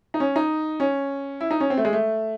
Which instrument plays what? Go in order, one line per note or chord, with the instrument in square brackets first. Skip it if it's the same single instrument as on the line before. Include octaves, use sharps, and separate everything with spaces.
[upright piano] D#4
C#4
D#4
C#4
E4
D#4
C#4
C4
A3
G#3
A3